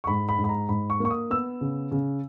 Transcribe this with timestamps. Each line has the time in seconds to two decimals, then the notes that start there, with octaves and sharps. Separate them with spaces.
0.04 C#6
0.07 G#2 B5
0.29 B5
0.38 G#2
0.44 B5
0.49 A#5
0.69 G#2 B5
0.90 C#6
1.00 A#3 C#6
1.10 D#6
1.30 B3 E6
1.61 C#3
1.92 C#3